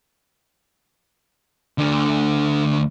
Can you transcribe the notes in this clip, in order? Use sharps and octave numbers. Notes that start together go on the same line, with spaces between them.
D2 D3